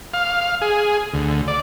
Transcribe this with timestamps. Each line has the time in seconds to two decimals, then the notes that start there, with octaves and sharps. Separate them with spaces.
0.14 F5
0.61 G#4
1.14 D2
1.48 D5